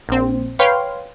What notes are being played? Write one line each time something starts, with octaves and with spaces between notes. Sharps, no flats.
A#1 C4
B4 C#5 F5 G5 C6